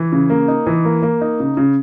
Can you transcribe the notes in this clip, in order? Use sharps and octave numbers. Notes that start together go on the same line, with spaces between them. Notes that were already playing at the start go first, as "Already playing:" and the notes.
Already playing: E3
C#3
A#3
D#4
E3
A#3
A#3
D#4
C#3
C#3